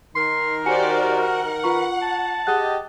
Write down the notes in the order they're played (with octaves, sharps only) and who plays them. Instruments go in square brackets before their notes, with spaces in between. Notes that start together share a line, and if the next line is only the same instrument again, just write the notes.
[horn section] D#3 A#4 [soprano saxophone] C6
[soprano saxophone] F#4 [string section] G4 C5 D5 [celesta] G#5 C#7
[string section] F#5
[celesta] F4 A#5 C#6 [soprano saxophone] B4
[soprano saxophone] A5
[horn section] G4 D#5 [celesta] G#4 F#5 F#6